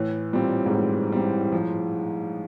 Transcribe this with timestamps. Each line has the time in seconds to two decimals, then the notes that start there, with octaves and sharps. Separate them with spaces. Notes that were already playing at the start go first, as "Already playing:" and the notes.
Already playing: A2 E3
0.33 A#2 G3 C4
0.66 G#2
0.72 A2 E3
1.12 G3 C4
1.52 F3